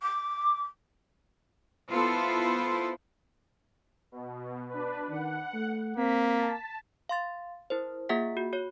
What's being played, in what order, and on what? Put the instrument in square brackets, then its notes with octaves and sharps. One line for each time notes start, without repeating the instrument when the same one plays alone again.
[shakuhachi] D6
[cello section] B3 E4 F4 A4 C5
[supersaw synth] B2
D4 B4
[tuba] D#3 [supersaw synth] F#5
[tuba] A3
[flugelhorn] A#3 [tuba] C4 [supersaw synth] B6
[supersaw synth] A5
[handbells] F5 C6 A6
E4 A#4 C5
A#3 F4 G#4 E5 F#5 B6
F#4
F#4 C#5